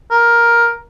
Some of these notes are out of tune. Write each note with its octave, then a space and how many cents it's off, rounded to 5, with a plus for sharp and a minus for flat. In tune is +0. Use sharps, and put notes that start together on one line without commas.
A#4 +10